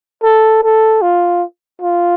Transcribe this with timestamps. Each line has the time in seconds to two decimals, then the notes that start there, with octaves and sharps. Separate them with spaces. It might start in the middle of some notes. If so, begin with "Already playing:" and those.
0.23 A4
0.63 A4
1.02 F4
1.82 F4